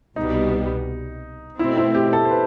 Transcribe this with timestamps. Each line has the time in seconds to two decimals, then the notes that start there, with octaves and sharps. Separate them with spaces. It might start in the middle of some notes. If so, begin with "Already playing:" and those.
0.16 C2 B2 G3 B3 D#4
1.59 B2 A3 C4 E4
1.77 E4
1.95 G4
2.13 A4
2.25 C5
2.31 B4